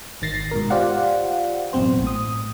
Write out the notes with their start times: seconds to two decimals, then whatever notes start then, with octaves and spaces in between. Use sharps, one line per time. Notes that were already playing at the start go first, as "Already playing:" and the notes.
0.22 G#1 D#3 A6 A#6 C7
0.51 G#2 B2 A#4
0.70 F4 G4 C5 D5 F5 F#5
1.73 A1 F#2 B2 C4 C5
2.02 A2 D#6